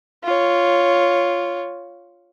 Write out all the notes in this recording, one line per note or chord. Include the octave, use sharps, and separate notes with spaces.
F4 C#5